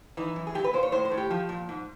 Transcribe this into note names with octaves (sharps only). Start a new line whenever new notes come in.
E3 D#4
F#2
G#4
A#2 G4
B4
A#2 C5
C#5
A2 C5
C5
A2
G4
F3
A#2
G#2